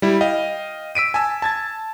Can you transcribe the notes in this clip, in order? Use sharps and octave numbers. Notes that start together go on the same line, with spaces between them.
G3 E4
D#5 F5 G5
E6 B6 D7 D#7
G#5 A5 E6
A5 G#6 A6